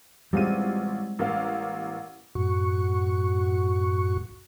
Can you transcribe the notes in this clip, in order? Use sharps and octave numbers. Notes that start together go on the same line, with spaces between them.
A1 G3 G#3 C4 F4 D#7
A1 A#3 F5
F#2 A2 F#4 C#6